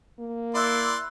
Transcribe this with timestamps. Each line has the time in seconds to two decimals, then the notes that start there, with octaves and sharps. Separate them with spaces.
0.19 A#3
0.55 E4 D5 B5 C6 E6 F#6